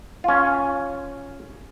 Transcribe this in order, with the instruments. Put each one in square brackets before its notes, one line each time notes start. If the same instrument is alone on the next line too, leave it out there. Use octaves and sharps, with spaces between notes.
[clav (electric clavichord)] C#4 F4